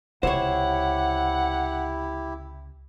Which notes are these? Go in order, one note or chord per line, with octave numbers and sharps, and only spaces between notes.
C#2 C3 E4 G4 C5 C#5 F#5